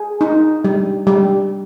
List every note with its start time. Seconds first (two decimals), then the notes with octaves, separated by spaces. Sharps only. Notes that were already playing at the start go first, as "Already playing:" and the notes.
Already playing: G#4
0.21 D#4
0.64 G3
1.07 G3